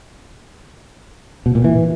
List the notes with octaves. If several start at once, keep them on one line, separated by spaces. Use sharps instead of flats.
B2
A#2
E3